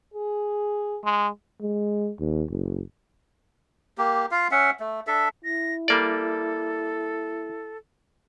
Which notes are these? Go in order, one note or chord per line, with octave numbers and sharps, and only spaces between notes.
G#4
G#3
G#3
D#2
F#1
A#3 G4
F4 F5
C#4 E5 F#5
A3
D4 A4 E5
E4 A#6
G3 A#3 A4 D5